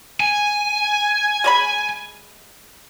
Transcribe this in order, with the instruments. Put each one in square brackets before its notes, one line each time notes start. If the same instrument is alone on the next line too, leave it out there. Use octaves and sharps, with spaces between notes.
[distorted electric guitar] G#5
[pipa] G#3 C#5 B5